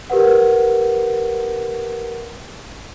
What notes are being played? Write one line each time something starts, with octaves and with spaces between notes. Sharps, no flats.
G4 A#4 B4 F#5